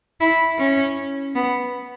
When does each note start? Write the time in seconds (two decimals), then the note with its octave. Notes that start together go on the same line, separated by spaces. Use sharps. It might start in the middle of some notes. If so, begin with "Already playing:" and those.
0.20 E4
0.58 C#4
1.36 B3